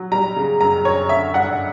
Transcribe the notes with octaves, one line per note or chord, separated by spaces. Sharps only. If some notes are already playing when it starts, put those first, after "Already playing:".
Already playing: F#3
G3 A#5
C#3
F#2 A#5
F#2 C#5
D3 E5
G2 F#5